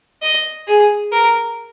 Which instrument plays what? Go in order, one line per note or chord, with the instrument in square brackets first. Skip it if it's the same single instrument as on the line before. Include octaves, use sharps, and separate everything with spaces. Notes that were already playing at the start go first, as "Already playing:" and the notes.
[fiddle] D#5
G#4
A#4